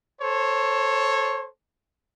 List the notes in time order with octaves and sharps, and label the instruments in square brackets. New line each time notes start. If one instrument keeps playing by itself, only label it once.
[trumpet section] A4 C5 C#5